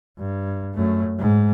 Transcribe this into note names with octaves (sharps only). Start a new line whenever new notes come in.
G2
F#2 A3
G#2